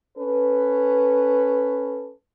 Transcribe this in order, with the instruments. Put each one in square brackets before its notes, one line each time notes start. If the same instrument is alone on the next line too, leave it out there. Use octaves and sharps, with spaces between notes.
[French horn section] C#4 A4 B4